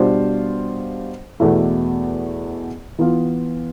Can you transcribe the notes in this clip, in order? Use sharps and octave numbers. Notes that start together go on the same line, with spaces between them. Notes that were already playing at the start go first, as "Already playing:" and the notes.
Already playing: B2 G3 D4 F4 C5
E2 B2 A3 E4
E3 B3 F4